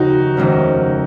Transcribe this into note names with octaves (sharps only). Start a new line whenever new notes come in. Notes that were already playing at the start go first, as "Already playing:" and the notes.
Already playing: F1 D#2 C#3 C#4 D#4 F#4
F1 D#2 C#3 G#3 C#4